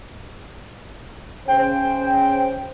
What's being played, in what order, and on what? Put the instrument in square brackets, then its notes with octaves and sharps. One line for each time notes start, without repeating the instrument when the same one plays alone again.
[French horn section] C#3 C5 [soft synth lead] G5